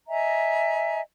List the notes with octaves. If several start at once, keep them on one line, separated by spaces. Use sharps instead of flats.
D#5 E5 G#5 A#5